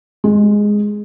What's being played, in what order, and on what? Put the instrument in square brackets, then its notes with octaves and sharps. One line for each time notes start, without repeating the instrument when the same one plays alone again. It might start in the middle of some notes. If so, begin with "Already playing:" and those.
[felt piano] G#3